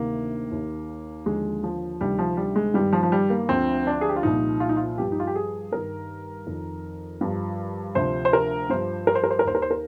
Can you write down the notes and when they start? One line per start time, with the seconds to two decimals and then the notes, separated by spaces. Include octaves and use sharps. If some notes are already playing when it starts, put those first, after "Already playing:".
Already playing: D2 C3 D#3 A#3
0.51 D#2 D#3
1.26 D#2 D3 F3 G#3
1.63 F3
2.01 D2 C3 D#3 G3
2.19 F3
2.37 G3
2.56 G#3
2.74 G2 D#3 G3
2.93 F3
3.03 F3
3.12 G3
3.30 A#3
3.49 D2 D3 F3 C4
3.87 D4
4.01 G#4
4.09 G4
4.16 F4
4.23 C2 A#2 F3 D#4
4.60 F4
4.69 D#4
4.77 F4
4.98 G2 F3 G4
5.12 D#4
5.20 F4
5.27 G4
5.35 G#4
5.72 G2 D#3 A#4
6.47 F2 D#3
7.21 G2 F3
7.95 D2 C3 F3 C5
8.25 C5
8.33 A#4
8.70 G2 F3 C5
9.07 A#4
9.15 C5
9.24 A#4
9.30 C5
9.39 A#4
9.45 D#2 D#3 C5
9.55 A#4
9.62 C5
9.71 A#4